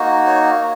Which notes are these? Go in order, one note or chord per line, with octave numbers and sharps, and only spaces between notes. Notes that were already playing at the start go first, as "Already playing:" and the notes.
Already playing: A#3 D#4 F#4
C#5